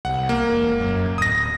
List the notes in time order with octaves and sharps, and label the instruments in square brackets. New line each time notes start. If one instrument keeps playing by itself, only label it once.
[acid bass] C2 [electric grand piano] F#5
[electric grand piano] A#3
[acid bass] E1
F#2
[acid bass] D1 [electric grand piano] D#6 A#6